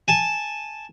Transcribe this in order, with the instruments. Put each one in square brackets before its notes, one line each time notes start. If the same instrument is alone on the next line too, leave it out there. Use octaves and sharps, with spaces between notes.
[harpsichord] G#5 A5